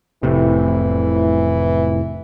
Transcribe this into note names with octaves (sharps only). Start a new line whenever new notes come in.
F1 A2 C3 E3